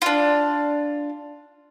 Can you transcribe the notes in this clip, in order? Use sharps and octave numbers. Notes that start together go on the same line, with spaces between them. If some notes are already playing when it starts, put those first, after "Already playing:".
D4 F4